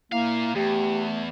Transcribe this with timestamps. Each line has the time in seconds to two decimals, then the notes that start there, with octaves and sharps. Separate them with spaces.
0.12 A#2 A#3 E4 F5
0.56 E2 A3 G4